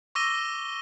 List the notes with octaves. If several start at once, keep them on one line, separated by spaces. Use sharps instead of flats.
C#6 D6 E6 A#6 D#7 G7